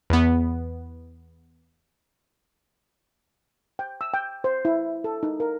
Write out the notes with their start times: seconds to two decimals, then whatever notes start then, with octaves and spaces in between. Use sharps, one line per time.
0.10 E2 B3
3.79 G5
4.01 E6
4.14 G5
4.44 C5
4.65 E4
5.04 A4
5.23 D#4
5.40 A#4